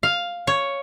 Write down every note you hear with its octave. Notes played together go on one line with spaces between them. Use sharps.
F5
C#5